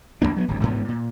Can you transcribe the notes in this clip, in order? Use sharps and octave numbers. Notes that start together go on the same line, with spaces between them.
G#1 G#2 A#3 D4
F#3 A#3 B3
D1 G#1 D2
A1 D2 G#2 B3
A#2